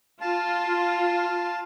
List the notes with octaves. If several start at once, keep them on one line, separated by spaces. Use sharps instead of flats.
F4 F5 A5